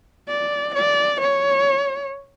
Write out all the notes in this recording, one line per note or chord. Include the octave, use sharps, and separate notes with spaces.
D5
D5
C#5